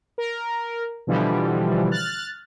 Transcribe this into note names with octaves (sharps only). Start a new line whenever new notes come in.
A#4
B2 D3 E3 F3 G3
F6 F#6 A6